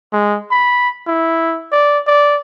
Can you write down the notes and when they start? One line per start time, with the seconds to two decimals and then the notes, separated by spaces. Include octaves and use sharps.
0.13 G#3
0.51 B5
1.07 E4
1.72 D5
2.07 D5